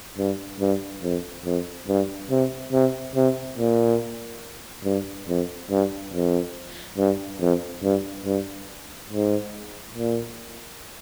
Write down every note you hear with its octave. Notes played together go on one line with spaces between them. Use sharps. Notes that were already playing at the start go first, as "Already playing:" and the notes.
G2
G2
F2
F2
G2
C3
C3
C3
A#2
G2
F2
G2
F2
G2
F2
G2
G2
G#2
A#2